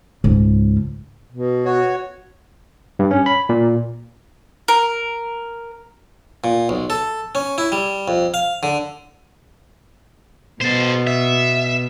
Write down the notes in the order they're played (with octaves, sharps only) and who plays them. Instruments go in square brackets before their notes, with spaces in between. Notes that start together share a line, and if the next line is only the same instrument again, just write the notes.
[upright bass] C#2 G#2
[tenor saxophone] B2
[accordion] F#4 C#5
[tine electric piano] G2
C#4
B5
A#2
[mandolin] A#4
[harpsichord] A#2
B1
A4
C#4
E4
G3
F2
F5
D3
[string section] B2 [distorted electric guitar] A4 C5
[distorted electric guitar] E5